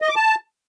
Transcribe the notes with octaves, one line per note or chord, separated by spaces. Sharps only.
D#5
D6
A5